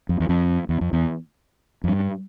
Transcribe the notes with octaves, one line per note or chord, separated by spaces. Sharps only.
F2
E2
F2
E2
F2
E2
F2
G2